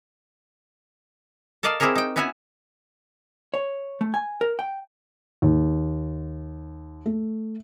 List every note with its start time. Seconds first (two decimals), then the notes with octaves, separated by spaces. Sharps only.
1.63 A4 A#4 D5 D#5 F5 A5
1.80 C4 E4 G4 G#4 A#4 C#5
1.95 D#4 G5
2.16 B3 C#4 E4 F#4 C#5 G#5
3.54 C#5
4.01 A3
4.14 G#5
4.41 A#4
4.59 G5
5.42 D#2
7.06 A3